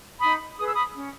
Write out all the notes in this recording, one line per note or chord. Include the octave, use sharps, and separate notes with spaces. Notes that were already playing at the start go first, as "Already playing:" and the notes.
D#4 B5 D#6
G#4 B4 D#6
E6
B5 D#6
C#4